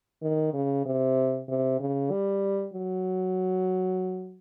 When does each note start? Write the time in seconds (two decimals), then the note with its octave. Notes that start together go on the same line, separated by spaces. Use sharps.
0.22 D#3
0.53 C#3
0.86 C3
1.49 C3
1.80 C#3
2.11 G3
2.74 F#3